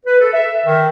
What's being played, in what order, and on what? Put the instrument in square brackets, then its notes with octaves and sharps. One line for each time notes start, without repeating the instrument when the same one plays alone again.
[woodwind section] B4
A4
E5
D#3